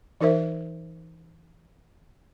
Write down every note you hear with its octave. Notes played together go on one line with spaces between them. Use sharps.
E3 D#4 A#4 C5 E5